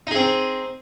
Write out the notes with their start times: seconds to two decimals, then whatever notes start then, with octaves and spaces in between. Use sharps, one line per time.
0.07 D#4
0.11 G#4
0.15 C4